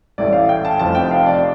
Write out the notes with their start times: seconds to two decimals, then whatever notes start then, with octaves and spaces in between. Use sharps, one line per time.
0.18 A1 A2 A3 D5
0.33 F5
0.49 G5
0.65 A5
0.79 F1 F2 F3 A5
0.95 G5
1.11 F5
1.26 D5